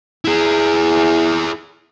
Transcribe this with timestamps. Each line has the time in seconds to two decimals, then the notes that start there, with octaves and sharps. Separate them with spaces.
0.25 E4 G#4